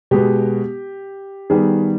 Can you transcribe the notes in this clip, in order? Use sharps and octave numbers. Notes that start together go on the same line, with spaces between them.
B2 G#3 B3 G4
D#3 G3 B3 G#4